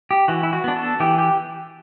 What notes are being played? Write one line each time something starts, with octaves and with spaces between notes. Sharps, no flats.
G4
E3 F#4
E4
F#4
B3 D4
A4
E3 G4
G4